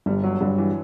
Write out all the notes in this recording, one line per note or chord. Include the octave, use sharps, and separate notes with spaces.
G1 G3
F#3
G2 D3 F#3
E3